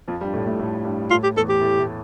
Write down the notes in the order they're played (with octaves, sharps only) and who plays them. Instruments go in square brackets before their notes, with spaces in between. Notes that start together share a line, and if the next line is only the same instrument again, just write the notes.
[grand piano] F2 F3
G2 G3
A2 A3
A2 A3
A2 A3
G2 G3
[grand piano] A2 A3 [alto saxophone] F4
[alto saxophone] G4
[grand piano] E2 E3 [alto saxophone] A4
[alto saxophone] G4
[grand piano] A2 A3
A2 A3